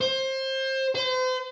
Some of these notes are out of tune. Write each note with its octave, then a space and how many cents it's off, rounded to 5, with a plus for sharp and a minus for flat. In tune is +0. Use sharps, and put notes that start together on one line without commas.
C5 +25
C5 -40